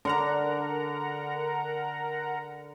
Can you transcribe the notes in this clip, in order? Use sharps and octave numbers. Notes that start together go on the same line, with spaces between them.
D3 A#4 F#5 A#5